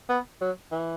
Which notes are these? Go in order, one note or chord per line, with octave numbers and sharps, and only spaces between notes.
B3
F#3
E3